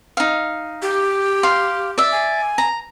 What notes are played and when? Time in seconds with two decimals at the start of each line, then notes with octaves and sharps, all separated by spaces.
0.17 D#4 F5
0.82 G4
1.43 F5 C6
1.98 D5 E5
2.12 G#5
2.58 A#5